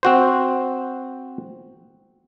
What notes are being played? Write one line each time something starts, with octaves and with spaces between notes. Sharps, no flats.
C4 F#4 C5